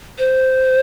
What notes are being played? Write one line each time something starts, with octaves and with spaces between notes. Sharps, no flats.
C5